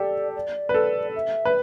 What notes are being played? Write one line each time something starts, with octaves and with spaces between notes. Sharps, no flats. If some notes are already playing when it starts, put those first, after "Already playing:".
Already playing: G4 A4 D5
D5
B4
A4
E5
B4